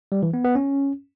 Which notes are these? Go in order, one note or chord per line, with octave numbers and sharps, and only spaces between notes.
G3
E3
B3
B3
C#4